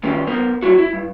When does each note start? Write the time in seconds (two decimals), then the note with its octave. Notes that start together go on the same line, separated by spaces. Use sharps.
0.03 G2 D#3 G#3 C#4 F4 G4
0.27 B3 A#4 C5
0.62 F#3 G3 E4 F#4
0.78 E4
0.93 G2